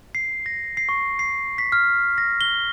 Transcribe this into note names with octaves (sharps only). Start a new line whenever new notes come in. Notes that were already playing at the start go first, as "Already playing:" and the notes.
C7
A#6
C7
C#6
C7
B6
F6
A#6
G7